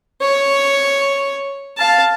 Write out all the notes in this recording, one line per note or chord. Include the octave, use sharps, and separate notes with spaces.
C#5
F5 A5